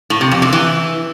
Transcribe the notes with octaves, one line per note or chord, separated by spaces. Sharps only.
A2
C3
F2
C3
E3